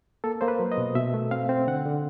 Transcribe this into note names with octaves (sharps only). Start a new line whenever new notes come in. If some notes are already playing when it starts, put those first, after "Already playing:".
A#3 A4
A#3 C5
B4
F#3
D#5
B2
B2 E5
A3
C4 F5
C4
D3 F#5
D3